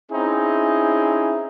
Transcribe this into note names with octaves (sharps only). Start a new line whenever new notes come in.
C4 C#4 D#4 E4 G#4